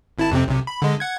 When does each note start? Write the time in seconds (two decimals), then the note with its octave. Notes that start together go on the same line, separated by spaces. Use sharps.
0.18 G#1 E4 A5
0.31 F2 C3 C4
0.47 B1 C3
0.67 B5
0.82 D3 G#3
1.00 F#5 G#6